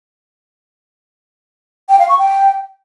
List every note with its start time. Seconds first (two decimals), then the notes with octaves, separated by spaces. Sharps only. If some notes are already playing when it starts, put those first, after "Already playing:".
1.89 G5
1.99 F5
2.09 C#6
2.19 G5